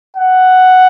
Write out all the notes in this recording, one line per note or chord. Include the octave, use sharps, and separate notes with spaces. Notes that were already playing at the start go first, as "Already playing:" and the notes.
F#5